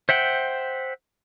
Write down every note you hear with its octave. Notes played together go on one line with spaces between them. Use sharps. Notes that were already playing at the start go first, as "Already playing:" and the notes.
C5 E5 F#5 G5